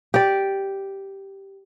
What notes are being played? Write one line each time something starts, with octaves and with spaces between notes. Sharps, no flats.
G4 D5